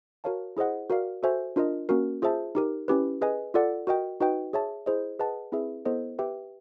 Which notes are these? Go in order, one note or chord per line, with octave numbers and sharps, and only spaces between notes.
F#4 A#4 C#5 F5 A5
E4 G#4 C5 D#5 F#5
F#4 A#4 D5 F5
F#4 A4 C5 E5 G#5
D4 F4 A#4 D#5
A#3 C#4 F#4 A#4
F4 G#4 C5 E5 A5
D#4 G4 A#4
C#4 E4 G4 B4
G#4 B4 D#5 G#5
F4 A4 D5 F#5
F#4 A#4 D#5 G5
D#4 F#4 B4 D#5 G5
G#4 C#5 E5 A5
E4 G#4 C5 D#5
G#4 B4 D#5 F#5 A5
C4 E4 G#4 B4 E5
B3 E4 A4 C5 D#5
G4 B4 E5 G5